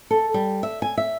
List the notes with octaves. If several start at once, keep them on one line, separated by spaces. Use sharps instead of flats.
A4
G3
E5
G#5
E5